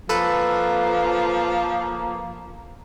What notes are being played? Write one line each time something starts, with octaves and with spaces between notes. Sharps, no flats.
F3 A#3 A4 B4